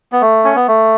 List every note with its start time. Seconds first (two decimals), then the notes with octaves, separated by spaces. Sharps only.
0.12 B3
0.22 A3
0.44 C#4
0.56 B3
0.68 A3